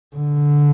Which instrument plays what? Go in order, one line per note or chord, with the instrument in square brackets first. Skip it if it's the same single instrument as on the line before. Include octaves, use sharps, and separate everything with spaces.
[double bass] D3